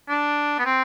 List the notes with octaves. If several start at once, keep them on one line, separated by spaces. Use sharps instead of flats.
D4
B3
C4